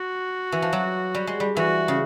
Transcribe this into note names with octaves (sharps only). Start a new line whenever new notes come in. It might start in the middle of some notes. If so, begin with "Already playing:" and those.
Already playing: F#4
E3
F3
F#3
G3
G#3
G3
E3 F#4
C#3